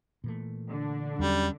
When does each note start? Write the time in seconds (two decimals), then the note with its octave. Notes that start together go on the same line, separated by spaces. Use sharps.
0.24 A#2 E3 A3
0.69 D3 D4
1.19 E2 F#3 G3 C4 C#4